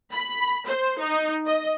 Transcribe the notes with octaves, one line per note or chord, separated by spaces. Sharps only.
B5
C5
D#4
D#5